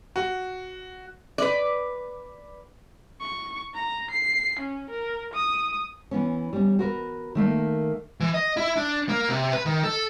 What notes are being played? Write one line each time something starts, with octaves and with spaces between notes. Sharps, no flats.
F#4
B4 D5
C#6
A#5
C7
C#4
A#4
D#6
E3 B3 C#4
G3 C#4
F#4 A#4 B4
D#3 A3 A#3
E3
D#5
E4
D4
A#3
C3
B4
D#3
A4